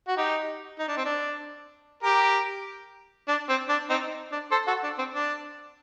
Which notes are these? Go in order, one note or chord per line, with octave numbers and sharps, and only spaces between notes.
F#4
D#4 G4
D#4
D4
C4
D4
G4 A#4
D4
C4
D4
C4 D#4
D4
A4 C5
F#4 A4
D4
C4
D4